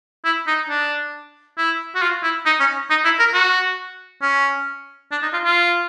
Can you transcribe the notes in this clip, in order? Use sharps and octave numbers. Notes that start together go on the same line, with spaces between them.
E4
D#4
D4
E4
F#4
F4
E4
D#4
C#4
D#4
E4
A#4
F#4
C#4
D4
D#4
F4
F4